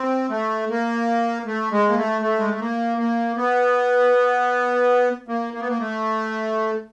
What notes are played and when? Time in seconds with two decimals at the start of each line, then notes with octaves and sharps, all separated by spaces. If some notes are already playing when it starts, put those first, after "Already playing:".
Already playing: C4
0.30 A3
0.70 A#3
1.46 A3
1.72 G#3
1.89 A#3
1.97 A3
2.22 A3
2.39 G#3
2.49 A3
2.60 A#3
2.98 A#3
3.37 B3
5.28 A#3
5.54 A#3
5.61 B3
5.69 A#3
5.79 A3